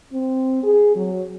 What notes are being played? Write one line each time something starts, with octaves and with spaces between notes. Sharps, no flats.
C4
G#4
F#3